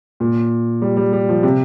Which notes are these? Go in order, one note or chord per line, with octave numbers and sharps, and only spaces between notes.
A#2
G3
G3
G3
F3
C3